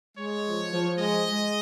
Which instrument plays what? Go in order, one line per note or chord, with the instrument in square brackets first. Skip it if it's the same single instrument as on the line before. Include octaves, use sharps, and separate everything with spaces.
[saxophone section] G#3 [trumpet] C#5
[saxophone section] F3
F3
[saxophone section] G#3 [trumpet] D#5
[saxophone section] G#3